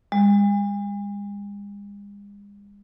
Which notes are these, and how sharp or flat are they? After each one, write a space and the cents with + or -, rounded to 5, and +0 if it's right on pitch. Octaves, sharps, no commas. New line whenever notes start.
G#3 -45